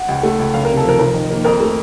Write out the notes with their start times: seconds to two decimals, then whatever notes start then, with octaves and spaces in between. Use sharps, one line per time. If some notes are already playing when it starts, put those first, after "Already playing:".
Already playing: F#5
0.09 C#2
0.23 A3
0.39 C#2
0.54 F#1 F5
0.65 A#4
0.70 C3
0.77 A4
0.84 F3 A#4
0.99 F1 A#4
1.14 D#3
1.30 A#3
1.44 F2 A#4
1.60 A3